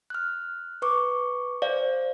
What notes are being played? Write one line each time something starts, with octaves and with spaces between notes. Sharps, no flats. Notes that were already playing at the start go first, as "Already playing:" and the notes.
F6 F#6
B4 C#6 D6
C5 D5 F5